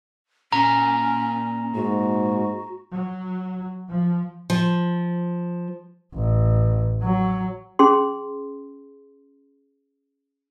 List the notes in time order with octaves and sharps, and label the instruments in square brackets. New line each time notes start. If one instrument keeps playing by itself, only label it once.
[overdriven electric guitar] A#2 [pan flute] C#4 [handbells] A#5
[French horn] G#2 [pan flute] F#4
[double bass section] F#3
F3
[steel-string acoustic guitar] F3
[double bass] A1
F#3
[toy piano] C#4 G#4 C6